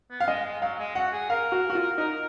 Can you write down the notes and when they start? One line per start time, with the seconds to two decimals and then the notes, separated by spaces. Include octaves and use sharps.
0.10 B3
0.20 F5
0.28 G#3 D#5
0.45 G#3
0.62 F#3 F5
0.79 G#3
0.95 F#4 F#5
1.13 G#4
1.30 A#4 F5
1.52 F#4
1.70 F#4
1.75 F4
1.98 D#4